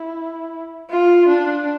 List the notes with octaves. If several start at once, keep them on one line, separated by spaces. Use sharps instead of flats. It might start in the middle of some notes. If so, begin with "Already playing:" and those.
Already playing: E4
F4
D4